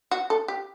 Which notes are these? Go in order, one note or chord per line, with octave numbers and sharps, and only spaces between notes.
F#4
A4
G4